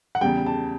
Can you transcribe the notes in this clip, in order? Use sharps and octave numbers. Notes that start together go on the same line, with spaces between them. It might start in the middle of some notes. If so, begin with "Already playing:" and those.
F#5
E2 C#3 G3 G5
A5